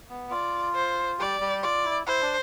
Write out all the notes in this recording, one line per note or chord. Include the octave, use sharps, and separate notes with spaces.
B3
F4 D5
C5
G3 G4 D5
G3 G4
F4 D5
E4
E4 C5
D4